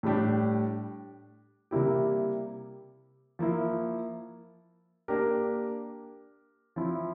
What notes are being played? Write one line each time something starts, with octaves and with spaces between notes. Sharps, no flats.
A2 G3 D4 G4
C3 G3 A#3 E4 G4
F3 A#3 E4
A#3 D4 G4 A#4
F3 C4 E4